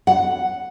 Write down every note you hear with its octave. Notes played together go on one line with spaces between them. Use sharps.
F#5